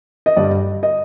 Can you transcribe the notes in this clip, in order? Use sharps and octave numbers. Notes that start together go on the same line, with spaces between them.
D#5
G2 D3 G3 D5
D#5